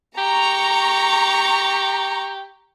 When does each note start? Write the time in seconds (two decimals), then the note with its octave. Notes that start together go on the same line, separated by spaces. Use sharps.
0.18 G4 A#5 C#6